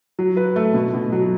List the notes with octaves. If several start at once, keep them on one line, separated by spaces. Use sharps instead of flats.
F#3
B4
A3
B2
B2
F#3